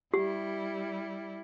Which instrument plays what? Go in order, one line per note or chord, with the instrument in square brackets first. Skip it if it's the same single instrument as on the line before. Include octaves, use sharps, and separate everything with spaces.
[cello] G3 E4 [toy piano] G4